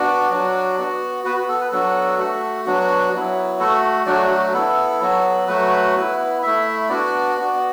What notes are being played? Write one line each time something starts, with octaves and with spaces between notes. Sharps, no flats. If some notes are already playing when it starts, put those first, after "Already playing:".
Already playing: B3 D4 F#4 D5
F#3 D4 F#4
B3 F#4
B3 F#4 B4
F#4
A4
B4
F#3 B3 D4 F#4 A4
A3 F#4
F#3 B3 D4 F#4
F#3 B3 E4
A3 F#4 A4
F#3 A3 D4 F#4 D5
F#4
B3 E4 A4
F#3 B3 F#4
F#3 A3 F#4 B4
B3 E4
A3 E4 E5
B3 D4 F#4 D5
B3 F#4